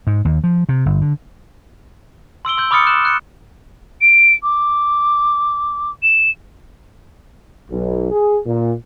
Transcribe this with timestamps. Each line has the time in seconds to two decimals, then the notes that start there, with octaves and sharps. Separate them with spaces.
0.07 G#2
0.25 D#2
0.44 F3
0.69 C3
0.86 G1
1.01 D3
2.45 C6 E6 D7 G7
2.57 C6 E6 G6
2.71 B5 D6 D#6 F6 A6 C#7
2.87 C6 F#6 E7
3.05 F#6 G6 C#7
4.02 D7
4.43 D6
6.03 E7
7.71 B1
8.11 G#4
8.47 A#2